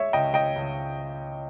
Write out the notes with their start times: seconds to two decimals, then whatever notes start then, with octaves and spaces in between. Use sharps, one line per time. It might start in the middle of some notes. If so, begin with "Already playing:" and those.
Already playing: G#3 C#5 E5
0.13 C#2 D#5 G5
0.34 D#5 G5
0.56 C#2